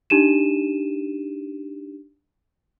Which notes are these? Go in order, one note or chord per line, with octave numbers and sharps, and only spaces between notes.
D4 D#4 G4 D#7 E7